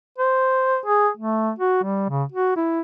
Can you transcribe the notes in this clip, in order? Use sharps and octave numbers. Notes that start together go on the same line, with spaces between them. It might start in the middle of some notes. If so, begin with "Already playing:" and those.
C5
G#4
A3
F#4
G3
C#3
F#4
E4